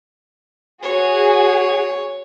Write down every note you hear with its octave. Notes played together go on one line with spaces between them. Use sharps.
F#4 G#4 C#5